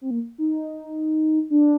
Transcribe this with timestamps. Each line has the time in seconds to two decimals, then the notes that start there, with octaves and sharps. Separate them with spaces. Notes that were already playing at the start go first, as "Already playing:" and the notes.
0.01 C4
0.11 A#3
0.38 D#4
1.50 D4